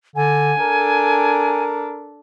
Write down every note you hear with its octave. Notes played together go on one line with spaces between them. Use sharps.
D3 G#5
D4 A4 A#4